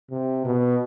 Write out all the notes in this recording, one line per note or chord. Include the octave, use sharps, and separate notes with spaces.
C3
B2